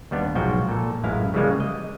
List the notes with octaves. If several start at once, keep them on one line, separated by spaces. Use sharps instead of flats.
D#2 G3 B3 D4
B1 G#2 F3 F#4 G5
A#2 A4
A1 F#2 G#3 E4 F5
C#3 E3 F3 G3 G#3 A#3
D#5